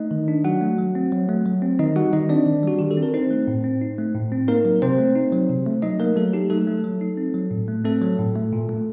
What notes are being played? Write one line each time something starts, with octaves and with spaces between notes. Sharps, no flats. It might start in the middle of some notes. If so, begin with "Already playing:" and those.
Already playing: A3 D#4 D#5
D#3
D4
F#3 F#4 F#5
A3
F#3
C4
F#3
A3
F#3
C4
D#3 D#4 D#5
G3 F#4 F#5
D#3 D#4 D#5
C4 D4 D5
D#3
G3 F#4
D#3 G4
A4
C4
A#4
C4 D#4 C5
A3
A2
C4
D#4
A3
A2
C4
A#3 D#4 A#4
F#3
C3 C4 C5
A3
D#4
F#3
C3
A3
F#3 D#4 D#5
A3 A#3 A#4
F#3 A3 A4
D#4 G4
F#3 A3 A4
A3
F#3
D#4
C4
F#3
A2
A3
A3 C4 A4
F#3
A2
A3
A#2
A3